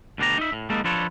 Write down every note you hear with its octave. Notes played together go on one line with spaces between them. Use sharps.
D2 B2 D4 G4 A#5
D#4 E5
A2
G#3 A#3 B3 D#4 A4
F3 D4 F4 A4 B4 C#5